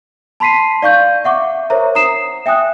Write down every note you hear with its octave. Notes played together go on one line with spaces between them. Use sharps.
A5 B5 C6 B6 C7 D#7
D5 F5 C#6 G6
E5 F#5 C#6 D6
A#4 C5 C#5 E5 A#5
A#5 D#6 C7 E7
E5 G5 G#5 D#6 F#6